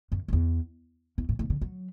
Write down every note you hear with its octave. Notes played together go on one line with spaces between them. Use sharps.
F#2
F#2
E2
E2
A2
A2
D3
F#3